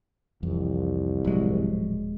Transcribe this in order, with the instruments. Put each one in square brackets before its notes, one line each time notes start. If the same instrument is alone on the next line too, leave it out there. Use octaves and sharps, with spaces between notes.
[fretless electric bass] F1 F2 E3 [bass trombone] C2
[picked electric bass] D#1 G#3 [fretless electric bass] A2 F3 F#3